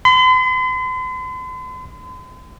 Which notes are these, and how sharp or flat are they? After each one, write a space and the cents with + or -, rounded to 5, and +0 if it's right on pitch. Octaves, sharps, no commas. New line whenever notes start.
C6 -45